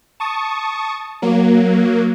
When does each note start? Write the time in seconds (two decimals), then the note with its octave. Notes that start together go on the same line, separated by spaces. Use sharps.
0.20 A5 C#6 D#6
1.22 F#3 A#3